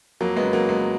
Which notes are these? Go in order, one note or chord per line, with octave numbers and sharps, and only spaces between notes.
F2 F#3 A#3
G#3 B3
C#3
F#3 A#3
F2 G#3 B3